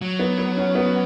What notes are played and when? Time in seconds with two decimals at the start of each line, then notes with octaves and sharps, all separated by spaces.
0.02 F#3
0.19 B3
0.38 B3
0.57 C#4
0.75 B3